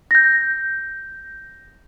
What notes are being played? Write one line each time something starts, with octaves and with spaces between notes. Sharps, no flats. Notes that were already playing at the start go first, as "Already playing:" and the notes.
G6 A#6